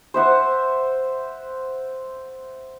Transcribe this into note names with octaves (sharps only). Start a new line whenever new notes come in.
C5 E5 F#5